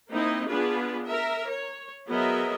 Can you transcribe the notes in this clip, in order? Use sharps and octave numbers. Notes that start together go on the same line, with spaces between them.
A#3 C4 D#4 E4 D#5
B3 D4 F4 G#4 B4
A#4 E5
C#5
F#3 B3 G#4 A#4 D#5 E5